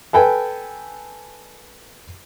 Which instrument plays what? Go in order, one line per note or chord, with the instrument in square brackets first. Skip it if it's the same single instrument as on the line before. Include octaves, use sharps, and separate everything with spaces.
[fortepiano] A4 B4 G5 G#5